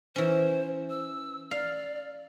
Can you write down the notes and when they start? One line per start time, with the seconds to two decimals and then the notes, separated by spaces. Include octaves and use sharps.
0.16 E3 C#4 C5
0.90 E6
1.51 D5 F5